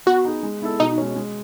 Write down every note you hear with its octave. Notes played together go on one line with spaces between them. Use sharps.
B3 F#4
D#4 G#4
G#3
B3 E4 A4
B2 D#4
G#3 C#4
G#3